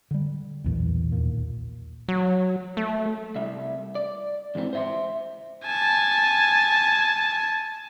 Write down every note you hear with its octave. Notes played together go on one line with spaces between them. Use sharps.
D3 G3
B1 E2 A#2
D#2 A#2
F#3
A3
C2 E5
D5
E2 G#2 E3 C4
C5 E5 C6
G#5 A5